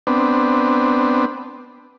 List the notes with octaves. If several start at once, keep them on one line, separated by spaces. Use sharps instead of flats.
B3 C4 D4